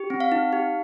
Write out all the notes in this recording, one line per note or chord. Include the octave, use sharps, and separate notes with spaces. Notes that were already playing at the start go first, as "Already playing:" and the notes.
Already playing: G4
C4
F5
D#4
G4